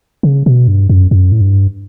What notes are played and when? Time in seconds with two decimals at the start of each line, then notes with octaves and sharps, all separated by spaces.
0.23 C#3
0.46 B2
0.68 G2
0.89 F#2
1.11 F#2
1.32 A2
1.41 G2